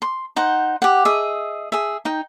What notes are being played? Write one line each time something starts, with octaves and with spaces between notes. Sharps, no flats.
C6
D#4 C5 F#5
G4 F#5
G#4 D#5 E5
G#4 E5
D#4 G5